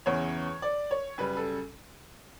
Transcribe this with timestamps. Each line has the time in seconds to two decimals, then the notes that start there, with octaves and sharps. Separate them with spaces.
0.06 E2 C#3 E3 C#5
0.62 D5
0.91 C#5
1.18 F#2 C#3 G3 B4
1.37 A4